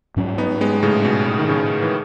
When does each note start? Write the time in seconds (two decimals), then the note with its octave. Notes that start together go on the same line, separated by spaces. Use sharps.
0.16 G#2 F#3 C#4
0.38 B3 D#4
0.61 G#3 B3
0.83 A2 C#3
1.05 B2
1.27 A2
1.39 D#3
1.49 A2 C#3
1.82 E3